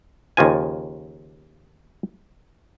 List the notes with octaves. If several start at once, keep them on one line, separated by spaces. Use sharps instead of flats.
D#2 C#3 F3 G#5